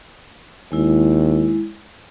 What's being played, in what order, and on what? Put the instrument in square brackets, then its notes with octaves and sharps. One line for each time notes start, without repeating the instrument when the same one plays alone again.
[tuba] D#2 [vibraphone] G#3 E4